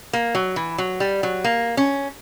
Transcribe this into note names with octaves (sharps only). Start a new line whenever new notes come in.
A#3
F#3
E3
F#3
G3
F#3
A#3
C#4